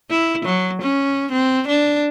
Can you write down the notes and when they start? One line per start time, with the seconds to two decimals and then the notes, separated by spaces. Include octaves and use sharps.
0.10 E4
0.45 F#3
0.82 C#4
1.32 C4
1.68 D4